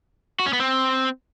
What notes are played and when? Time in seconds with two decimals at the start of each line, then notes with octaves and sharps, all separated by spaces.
0.39 F#4
0.46 C#4
0.53 B3
0.60 C4